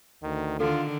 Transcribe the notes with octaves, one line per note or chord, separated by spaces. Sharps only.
D2 D#3
D3 D#3 F4 A4